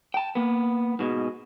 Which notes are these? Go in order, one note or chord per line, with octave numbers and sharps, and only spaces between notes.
G5 A5
A#3 B3
G#2 B2 G#3